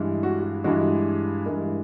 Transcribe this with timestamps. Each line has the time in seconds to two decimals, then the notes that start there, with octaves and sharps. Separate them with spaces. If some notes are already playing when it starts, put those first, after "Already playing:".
Already playing: G2 E3 G#3
0.23 F#4
0.64 G2 E3 G#3 F#4
1.46 G2 E3 G#3 A#4